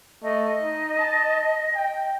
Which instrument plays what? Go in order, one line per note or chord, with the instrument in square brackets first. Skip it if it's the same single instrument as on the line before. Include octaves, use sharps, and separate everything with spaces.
[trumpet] A3 [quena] D#5
[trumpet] D#4
A5
G5